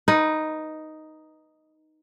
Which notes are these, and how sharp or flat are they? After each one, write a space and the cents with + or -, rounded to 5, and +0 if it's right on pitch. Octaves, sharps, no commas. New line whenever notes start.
D#4 +0 B4 -15